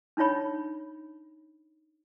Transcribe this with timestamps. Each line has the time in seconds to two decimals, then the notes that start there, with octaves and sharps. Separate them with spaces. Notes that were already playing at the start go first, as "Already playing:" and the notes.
0.17 D4 D#4 F4 C#5 B5